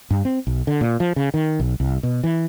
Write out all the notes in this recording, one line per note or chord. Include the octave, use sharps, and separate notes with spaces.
G2
C4
B1
D3
A#2
F3
C#3
D#3
B1
C2
B2
E3